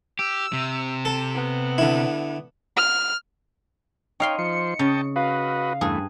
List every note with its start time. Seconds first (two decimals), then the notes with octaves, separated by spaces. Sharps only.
0.19 G4 E6
0.53 C3
1.05 A4
1.34 B3
1.78 D3 E4
2.76 F6
4.20 D#4 C#5 F5 G5 C6
4.39 F3 C5 C#7
4.79 C#3 D#5 G5 A5
5.16 F#4 B4 D#5 F5
5.81 E2 G2 A3 G#4